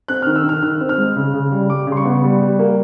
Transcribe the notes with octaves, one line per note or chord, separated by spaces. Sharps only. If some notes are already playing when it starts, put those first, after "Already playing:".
C4 F#6
D#3 F6
E6
D#3
F6
D#3 F#6
C4
F6
G#3
C#3
C#3
G3
G3 D6
C#3
C6
C#6
B3
G3
G3
A#3